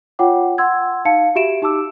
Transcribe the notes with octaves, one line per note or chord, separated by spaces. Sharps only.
F4 C#5 F#5 G5 D6
F#5 C6 E6 G#6
D#4 F5 A5 C#7
F#4 G4 E5 D7 E7
D#4 G4 A5 D6 E6